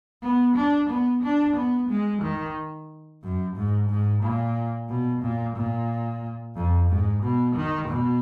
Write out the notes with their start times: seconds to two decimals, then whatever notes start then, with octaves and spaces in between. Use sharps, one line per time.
0.22 B3
0.55 D4
0.89 B3
1.23 D4
1.56 B3
1.90 G#3
2.22 D#3
3.23 F#2
3.57 G#2
3.90 G#2
4.23 A#2
4.89 B2
5.22 A#2
5.56 A#2
6.55 F2
6.89 G#2
7.23 B2
7.55 D#3
7.89 B2